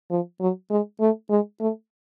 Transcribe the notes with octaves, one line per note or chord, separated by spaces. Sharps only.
F3
F#3
G#3
A3
G#3
A3